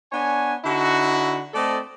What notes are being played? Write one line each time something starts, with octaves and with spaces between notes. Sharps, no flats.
B3 D4 C#5 G#5
D3 D#4 E4 F#4
A3 C4 A4 D5 D#5